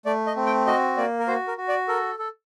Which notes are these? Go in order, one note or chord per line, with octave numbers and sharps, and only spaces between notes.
A3 D5
D#5
C4
G5
F#4 D#5
A#3 D5
A#4
F#4 C5
A#4
F#4
D5
A4 A#4
A4